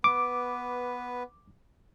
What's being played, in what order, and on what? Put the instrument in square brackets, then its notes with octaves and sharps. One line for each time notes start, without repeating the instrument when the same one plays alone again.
[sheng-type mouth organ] B3 B4 [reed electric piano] D6